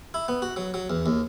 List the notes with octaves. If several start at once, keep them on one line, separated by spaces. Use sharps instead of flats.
E4
B3
F#4
F#3
F#3
E2
D#2